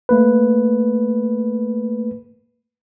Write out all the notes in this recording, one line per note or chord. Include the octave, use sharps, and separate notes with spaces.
A3 A#3 B4